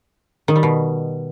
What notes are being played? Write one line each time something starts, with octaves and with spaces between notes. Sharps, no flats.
D#3
G3
B2